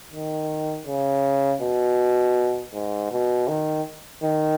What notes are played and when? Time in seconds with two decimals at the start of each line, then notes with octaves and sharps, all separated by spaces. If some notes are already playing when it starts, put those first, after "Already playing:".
0.12 D#3
0.87 C#3
1.62 B2
2.74 G#2
3.11 B2
3.48 D#3
4.23 D#3